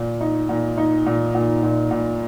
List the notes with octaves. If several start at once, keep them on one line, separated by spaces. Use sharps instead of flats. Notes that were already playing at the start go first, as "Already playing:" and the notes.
Already playing: A#2
D#4
A#2
D#4
A#2
A#2
A#2
A#2